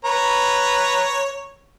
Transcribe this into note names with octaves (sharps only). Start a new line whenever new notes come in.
B4 C#5 A#5